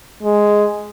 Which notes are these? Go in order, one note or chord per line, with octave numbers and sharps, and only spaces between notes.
G#3